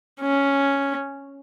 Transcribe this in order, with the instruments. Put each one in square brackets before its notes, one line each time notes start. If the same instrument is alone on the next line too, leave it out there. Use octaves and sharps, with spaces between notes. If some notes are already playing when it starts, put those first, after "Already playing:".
[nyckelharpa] C#4